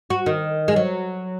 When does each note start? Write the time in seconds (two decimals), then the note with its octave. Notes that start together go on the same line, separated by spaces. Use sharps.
0.10 F#4
0.26 D#3
0.68 G#3
0.76 F#3